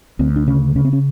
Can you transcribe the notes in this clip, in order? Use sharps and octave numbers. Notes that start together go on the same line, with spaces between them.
D2 C4
D4
C#3 C#4
C#3 C#4
C4
C#4